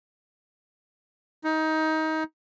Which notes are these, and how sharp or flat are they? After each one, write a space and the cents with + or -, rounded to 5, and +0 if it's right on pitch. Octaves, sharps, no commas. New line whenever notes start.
D#4 +20